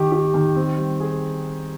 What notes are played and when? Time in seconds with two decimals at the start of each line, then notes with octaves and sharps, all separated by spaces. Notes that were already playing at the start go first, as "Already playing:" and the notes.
Already playing: D#3 G4
0.12 G4
0.34 D#3
0.55 C4
0.78 G3
1.00 G#4